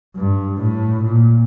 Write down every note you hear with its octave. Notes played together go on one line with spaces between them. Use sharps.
G2
A2
A#2